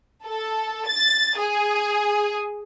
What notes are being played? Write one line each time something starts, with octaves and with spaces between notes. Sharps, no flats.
A4
A6
G#4